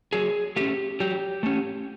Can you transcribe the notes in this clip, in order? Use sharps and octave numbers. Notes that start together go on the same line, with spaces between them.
F#3 G#4
A3 C#4 G4
F#3 G4
A3 C#4